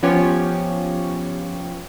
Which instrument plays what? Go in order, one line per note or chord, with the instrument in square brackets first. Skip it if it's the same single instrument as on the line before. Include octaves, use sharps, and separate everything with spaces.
[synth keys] F3 B3 C#4 F4 G4 C#5